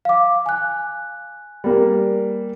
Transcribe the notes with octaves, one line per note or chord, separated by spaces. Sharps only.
F5 D6
G#5 F#6
G3 A#3